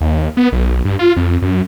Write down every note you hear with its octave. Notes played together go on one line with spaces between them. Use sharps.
D#2
B3
B1
G2
F4
F2
F#2